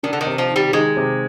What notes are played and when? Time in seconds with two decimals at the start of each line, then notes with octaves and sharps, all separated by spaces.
0.03 D#3 D4
0.13 D3
0.21 D#3
0.27 C3
0.38 F3
0.50 D#3
0.56 G3
0.73 D#3 G#3
0.97 C3